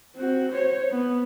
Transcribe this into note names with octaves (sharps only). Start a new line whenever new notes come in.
C4 F#4
C5 C#5
B3